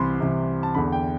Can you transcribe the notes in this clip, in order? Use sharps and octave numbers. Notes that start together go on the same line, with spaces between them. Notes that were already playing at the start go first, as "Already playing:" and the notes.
Already playing: C2 C3 E3 B5 C6
C2 C3 E3
A5
E2 D3 B5
G5